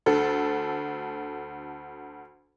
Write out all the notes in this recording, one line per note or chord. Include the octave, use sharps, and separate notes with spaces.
D2 A4